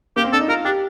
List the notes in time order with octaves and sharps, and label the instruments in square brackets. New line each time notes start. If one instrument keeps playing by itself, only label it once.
[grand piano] A#3 [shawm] G4
[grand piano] C4
[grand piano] D4 [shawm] A4
[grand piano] D#4
[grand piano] F4 [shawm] A#4
[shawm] D4 [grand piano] G4